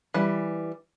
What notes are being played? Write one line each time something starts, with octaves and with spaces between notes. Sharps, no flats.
E3 G3